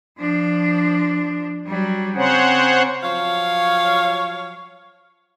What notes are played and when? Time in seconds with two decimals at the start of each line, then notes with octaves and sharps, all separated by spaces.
0.18 F3 D4
1.66 F#3 G3
2.16 C#3 C4 C5 C#5 F#5
3.02 F3 F#3 C#5 F5